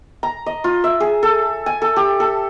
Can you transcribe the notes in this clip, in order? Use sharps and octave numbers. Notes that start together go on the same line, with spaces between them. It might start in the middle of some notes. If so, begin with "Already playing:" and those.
A#5
D#5
F4
E5
G#4
A4
G#5
A4
G4
A4